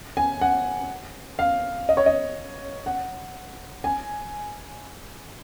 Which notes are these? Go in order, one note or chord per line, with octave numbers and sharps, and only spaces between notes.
G#5
F#5
F5
D#5
C#5
D#5
F#5
G#5